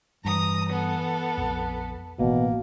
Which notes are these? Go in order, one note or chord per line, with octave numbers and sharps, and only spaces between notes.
G2 E3 A#5 D#6
B3 A4
A#1 F2
A1 B2 E3 A#3